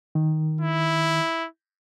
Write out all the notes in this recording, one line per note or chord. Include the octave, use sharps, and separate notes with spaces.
D#3
E4